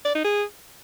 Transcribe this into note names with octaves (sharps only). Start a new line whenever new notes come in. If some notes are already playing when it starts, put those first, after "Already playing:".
D5
D#4
G#4